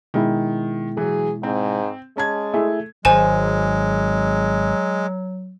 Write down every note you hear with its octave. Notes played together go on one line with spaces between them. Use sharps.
B2 D#3 G#3 E4
E3 F#3 G#4
G#2 C4
G#3 C#4 A5 G#6
A3 E4 G#4 E5
G#1 F#3 G#3 C5 G#5 E7